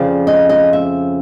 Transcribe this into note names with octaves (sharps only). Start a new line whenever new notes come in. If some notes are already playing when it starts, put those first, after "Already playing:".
Already playing: F2 C#3 F3 D5
D#5
D#5
E5